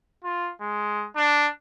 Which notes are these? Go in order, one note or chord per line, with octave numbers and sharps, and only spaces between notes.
F4
G#3
D4